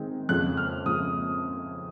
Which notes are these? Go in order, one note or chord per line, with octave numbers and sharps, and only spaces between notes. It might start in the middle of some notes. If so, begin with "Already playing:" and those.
Already playing: D#3 G#3 C4 D#4
F2 C#3 F3 G#3 F#6
F6
C#3 F3 G#3 D#6